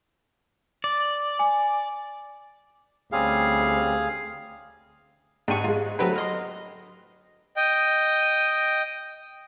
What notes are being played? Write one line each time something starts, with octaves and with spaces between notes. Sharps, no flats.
D5
G#5
D2 G3 C4 C#4 G#4 F5
G#2 D4 G4 C#6 D#7
G#2 G#3 F4
D3 F#3 A3 B3 C4 B4
F#3 D#5 C6 F6
D#5 G5